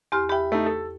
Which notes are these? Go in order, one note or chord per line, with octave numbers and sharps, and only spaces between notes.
E2 G4 C6 F6
G4 E5 G5 B5
A3 D#4
A4